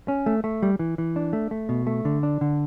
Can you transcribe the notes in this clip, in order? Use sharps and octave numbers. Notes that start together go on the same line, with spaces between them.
C#4
A3
A3
G3
E3
E3
D4
A3
A3
B2
A3
D3
D4
D3